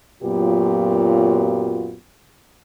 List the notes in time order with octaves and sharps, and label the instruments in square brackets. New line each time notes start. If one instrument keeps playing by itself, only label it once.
[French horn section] F#2 A#2 F#3 B3 F4 G4